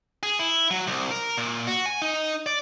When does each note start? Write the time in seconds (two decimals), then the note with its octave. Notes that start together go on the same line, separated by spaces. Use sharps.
0.23 G#4
0.39 E4
0.71 F#3
0.87 C2
1.11 A#4
1.38 A#2
1.67 F#4
1.86 G#5
2.02 D#4
2.46 D5